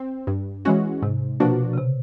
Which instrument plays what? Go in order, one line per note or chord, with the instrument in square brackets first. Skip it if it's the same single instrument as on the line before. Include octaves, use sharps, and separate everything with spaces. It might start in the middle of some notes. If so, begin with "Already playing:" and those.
Already playing: [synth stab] C4
G2
E3 G#3 C#4 F#4
[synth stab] G#2 [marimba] C3
[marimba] B2 [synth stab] F3 A#3 D4 F#4
[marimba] C#3
C3